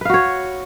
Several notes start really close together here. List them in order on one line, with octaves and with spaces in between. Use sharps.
B4 F5 F#4 C#5